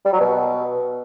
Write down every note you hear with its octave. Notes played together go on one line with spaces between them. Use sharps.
G3
F#3
B2